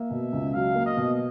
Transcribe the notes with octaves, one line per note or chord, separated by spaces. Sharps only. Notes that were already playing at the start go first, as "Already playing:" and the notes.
Already playing: A#3 E5
B2
C#2
F#3 F5
A#3
D#5
B2